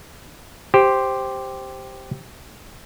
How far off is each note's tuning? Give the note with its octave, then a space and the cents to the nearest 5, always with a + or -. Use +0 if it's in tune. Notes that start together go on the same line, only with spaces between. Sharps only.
G4 +0 C5 +0